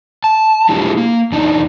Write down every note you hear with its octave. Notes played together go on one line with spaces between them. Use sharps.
A5
G#3 D4 E4 F4 G4 G#4
A#3
E2 D4 D#4 D#5